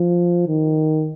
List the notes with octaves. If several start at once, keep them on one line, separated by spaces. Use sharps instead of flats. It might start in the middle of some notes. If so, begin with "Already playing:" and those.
Already playing: F3
D#3